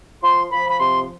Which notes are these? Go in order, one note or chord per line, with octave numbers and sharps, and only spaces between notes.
F3 C6
F3 B5
B5
C3 C6